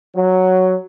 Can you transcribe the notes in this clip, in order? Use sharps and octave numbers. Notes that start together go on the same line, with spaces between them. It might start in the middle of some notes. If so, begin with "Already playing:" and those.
F#3